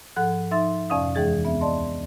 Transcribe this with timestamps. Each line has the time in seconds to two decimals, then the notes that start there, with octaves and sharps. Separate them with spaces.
0.16 G#2 F3 A4 F#5 F#6
0.51 F3 D#4 E5 C6 E6 A6
0.90 F2 C3 C#4 D5 F5 D#6
1.15 D#2 E3 G#3 G#4 A6
1.44 D2 B3 C4 E5
1.61 D5 D#5 A5 C6